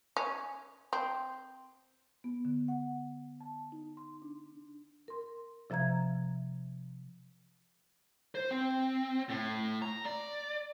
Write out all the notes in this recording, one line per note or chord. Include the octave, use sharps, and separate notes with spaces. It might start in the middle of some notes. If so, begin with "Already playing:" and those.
C#4
C4
B3
D3
F#5
A5
D#4
C6
D4
A#4 C6
C3 F3 E5 A#5 G#6
C5
C4
A2
A#5
D5